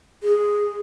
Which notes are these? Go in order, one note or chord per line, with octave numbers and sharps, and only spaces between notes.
G#4